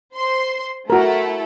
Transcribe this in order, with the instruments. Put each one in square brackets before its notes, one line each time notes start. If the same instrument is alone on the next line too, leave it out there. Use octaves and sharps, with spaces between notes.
[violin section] C5 C6
[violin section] A3 E4 A4 [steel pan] F#4 A#4